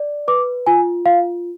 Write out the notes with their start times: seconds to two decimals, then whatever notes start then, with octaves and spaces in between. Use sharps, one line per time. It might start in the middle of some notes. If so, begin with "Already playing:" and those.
Already playing: D5
0.28 B4 D6
0.67 F4 G#5
1.06 F4 F5